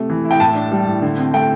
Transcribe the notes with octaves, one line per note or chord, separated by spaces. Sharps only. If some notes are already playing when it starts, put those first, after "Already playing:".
Already playing: C3 A3
E3
E4
G5
A2 A5
D4
G3
A2
D3
C4
A3 G5